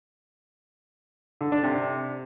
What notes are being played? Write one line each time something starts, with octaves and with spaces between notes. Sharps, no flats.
D3
D4
C3